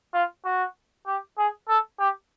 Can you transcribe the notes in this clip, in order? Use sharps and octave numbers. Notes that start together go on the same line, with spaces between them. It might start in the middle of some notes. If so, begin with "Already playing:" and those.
F4
F#4
G4
G#4
A4
G4